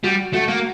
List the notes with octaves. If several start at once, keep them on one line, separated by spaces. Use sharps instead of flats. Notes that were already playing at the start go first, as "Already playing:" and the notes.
G3 F#4
A3 F#4
A#3